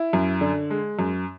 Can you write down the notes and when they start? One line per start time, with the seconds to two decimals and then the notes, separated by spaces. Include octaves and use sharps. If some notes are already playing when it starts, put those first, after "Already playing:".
Already playing: E4
0.13 F#2
0.41 D3
0.70 G#3
0.99 F#2